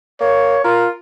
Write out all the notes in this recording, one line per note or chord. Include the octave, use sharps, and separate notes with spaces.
A#3 C#5
F4 A#4